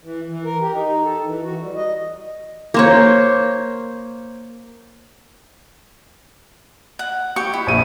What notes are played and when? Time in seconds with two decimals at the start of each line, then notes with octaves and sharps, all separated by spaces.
0.03 E3
0.29 E3
0.45 A#4
0.61 G4
0.73 D#4
1.04 A4
1.26 E3
1.44 F#4
1.62 G3
1.76 D#5
2.74 A#3 C5 C#5
6.99 F#5
7.36 G4 C#6
7.53 E4
7.67 A#1 D#7